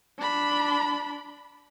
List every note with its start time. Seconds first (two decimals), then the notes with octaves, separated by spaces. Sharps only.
0.19 D4 B5